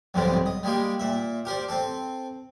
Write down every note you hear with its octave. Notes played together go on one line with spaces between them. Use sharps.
B1 F2 G#2 D3 D#3 G3
D#5
G3 G#3 A#3 G4
A#2 E5
G4 A#4 C5 D5
C4 A4